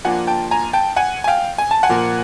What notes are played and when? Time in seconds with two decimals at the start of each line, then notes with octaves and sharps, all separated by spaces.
0.05 F3 A#3 D4 F4 F#5 G#5
0.27 G5 A5
0.51 G#5 A#5
0.73 G5 A5
0.96 F#5 G#5
1.24 G#5
1.28 F5 G5
1.58 G#5
1.71 A5
1.83 F#5 G#5
1.89 A#2 F3 A#3